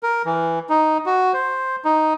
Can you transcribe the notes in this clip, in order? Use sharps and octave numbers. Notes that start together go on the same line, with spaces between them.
A#4
E3
D#4
F#4
C5
D#4